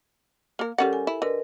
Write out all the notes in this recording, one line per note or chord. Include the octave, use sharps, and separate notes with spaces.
A#3 A#4
G3 C#4 G4 A4 A#4 F#5
G#5
E4
D3 A#4 B4 D#5